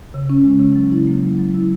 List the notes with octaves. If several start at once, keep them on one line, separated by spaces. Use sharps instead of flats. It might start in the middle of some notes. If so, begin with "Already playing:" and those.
C#3
C#4
G#3
C#3
F#3
E4
A#3
F#3
F#3
E4